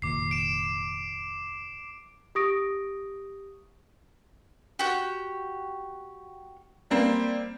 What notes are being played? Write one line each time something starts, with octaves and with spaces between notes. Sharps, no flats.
F1 A#2 D#3 D6 C7
D7 E7
G4 C#6 D#6 A#6 D7
F#4 G4
G3 A#3 C4